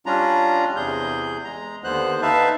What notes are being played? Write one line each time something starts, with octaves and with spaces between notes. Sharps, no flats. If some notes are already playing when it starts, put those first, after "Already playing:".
G3 C#4 D4 F4 A#5
E2 C3 G#4 G6
G#3 A#5
D#2 D3 B3 C5 F#6
D#4 B4 E5 F5 A5